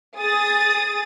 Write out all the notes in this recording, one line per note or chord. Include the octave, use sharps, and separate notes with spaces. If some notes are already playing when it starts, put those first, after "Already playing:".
G#4 D#6 A6